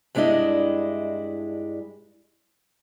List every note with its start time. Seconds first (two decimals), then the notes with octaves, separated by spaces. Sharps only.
0.15 G2 G#3 C#4 D4 E4 D#5